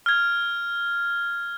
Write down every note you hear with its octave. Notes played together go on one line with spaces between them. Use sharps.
F6 G#6